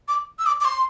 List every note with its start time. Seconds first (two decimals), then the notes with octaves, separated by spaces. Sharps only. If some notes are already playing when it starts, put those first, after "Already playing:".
0.08 D6
0.39 E6
0.46 D6
0.61 D6
0.65 C6